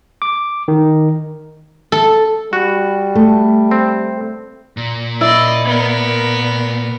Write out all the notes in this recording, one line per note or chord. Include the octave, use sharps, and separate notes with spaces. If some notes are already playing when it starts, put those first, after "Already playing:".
D6
D#3
A4
G3 F#4
A3
C4
A#2
E4 D5 D#5
B3 A#4